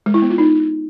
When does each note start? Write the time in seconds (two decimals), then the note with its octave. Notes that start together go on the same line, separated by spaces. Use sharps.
0.06 G#3
0.14 E4
0.22 B3
0.30 F4
0.38 D#4